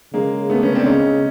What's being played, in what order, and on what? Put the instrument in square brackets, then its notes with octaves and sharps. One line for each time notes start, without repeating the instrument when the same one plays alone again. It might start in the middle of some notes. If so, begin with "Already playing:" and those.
[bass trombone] C#3 [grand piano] G#3 A#3
[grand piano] A3 B3
B3 C#4
C4 D4
[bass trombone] C#3 [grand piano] C#4 D#4